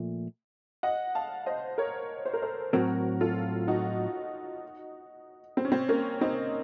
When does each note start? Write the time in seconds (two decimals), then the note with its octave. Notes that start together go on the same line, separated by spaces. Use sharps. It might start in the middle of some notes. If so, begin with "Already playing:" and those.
Already playing: A#2 F3 A3
0.83 D#5 F#5
1.15 F5 A5
1.46 C5 D#5
1.78 A#4 C#5
2.25 C5
2.33 A#4
2.42 A4 C5
2.73 A2 F#3 C4 F#4 A#4
3.21 F4 A4
3.68 D#4 F#4
5.57 C4
5.65 C#4
5.72 C4
5.89 A#3 C#4
6.21 C4 D#4